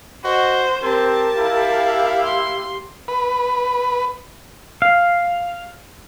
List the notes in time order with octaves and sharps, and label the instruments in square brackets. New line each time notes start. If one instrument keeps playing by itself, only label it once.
[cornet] F#4 [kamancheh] C5 [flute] D#5
[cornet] C4 [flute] G4 [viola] A#4 A5
[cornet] E4 [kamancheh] F5
[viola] C6
[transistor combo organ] B4
[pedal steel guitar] F5